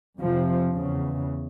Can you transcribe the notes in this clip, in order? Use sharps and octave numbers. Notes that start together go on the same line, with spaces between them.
F2 C3 F3
E2 C#3